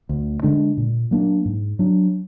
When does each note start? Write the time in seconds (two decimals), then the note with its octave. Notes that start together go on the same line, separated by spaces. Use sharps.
0.09 D2
0.43 D3 G#3 D4
0.77 A#2
1.11 F#3 A#3 D4
1.45 G#2
1.79 F#3 D4